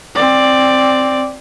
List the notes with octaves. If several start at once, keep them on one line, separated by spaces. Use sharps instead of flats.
C4 D5